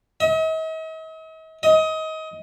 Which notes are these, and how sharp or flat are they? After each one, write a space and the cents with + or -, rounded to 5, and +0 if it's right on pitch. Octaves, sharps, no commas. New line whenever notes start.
D#5 +45
D#5 +25